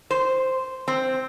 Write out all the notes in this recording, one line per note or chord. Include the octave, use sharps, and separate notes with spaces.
C5
C4